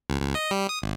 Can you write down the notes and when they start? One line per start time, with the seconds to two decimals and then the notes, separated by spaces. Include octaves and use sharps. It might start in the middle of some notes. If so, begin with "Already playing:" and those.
0.10 C#2
0.22 C#2
0.35 D#5
0.51 G3
0.69 D#6
0.82 G#1